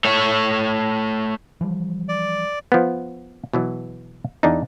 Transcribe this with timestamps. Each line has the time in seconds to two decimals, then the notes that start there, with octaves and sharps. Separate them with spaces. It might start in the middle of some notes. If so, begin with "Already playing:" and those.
0.05 A3 C#5
1.61 E3 F3 G3
2.09 D5
2.72 F3 B3
3.53 B2 E3 F#3
4.43 E2 D4 D#4